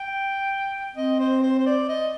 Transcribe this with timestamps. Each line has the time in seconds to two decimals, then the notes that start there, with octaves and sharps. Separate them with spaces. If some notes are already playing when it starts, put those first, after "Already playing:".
Already playing: G5
0.96 C4 D#5
1.20 C5
1.43 C5
1.59 C5
1.66 D5
1.89 D#5